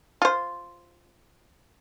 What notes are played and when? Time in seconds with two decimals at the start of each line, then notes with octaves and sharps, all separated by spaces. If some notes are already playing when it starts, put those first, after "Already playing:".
0.22 F4 C5